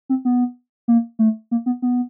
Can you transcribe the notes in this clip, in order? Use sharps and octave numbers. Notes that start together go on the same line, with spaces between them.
C4
B3
A#3
A3
A#3
B3
B3